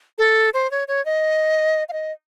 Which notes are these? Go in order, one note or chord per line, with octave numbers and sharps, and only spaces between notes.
A4
C5
C#5
C#5
D#5
F5
D#5